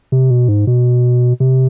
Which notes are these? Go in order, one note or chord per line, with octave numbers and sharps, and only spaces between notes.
C3
B2
G#2
B2
C3